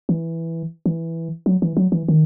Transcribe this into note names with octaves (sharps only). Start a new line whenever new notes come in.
E3
E3
F#3
E3
F#3
E3
D#3